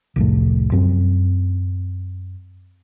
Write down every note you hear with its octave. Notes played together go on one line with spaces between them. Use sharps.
C2 F2 A2
F#2 C4